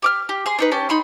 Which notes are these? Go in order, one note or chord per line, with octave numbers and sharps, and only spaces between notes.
G4 D6 F6
G4
G#4 C6
D4 D#4 B4
C#4 G4 A5
D#4 B5 C6